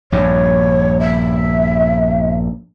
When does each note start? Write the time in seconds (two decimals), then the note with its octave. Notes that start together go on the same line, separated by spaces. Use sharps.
0.12 A#1 G2 A#2 C#5
1.00 E5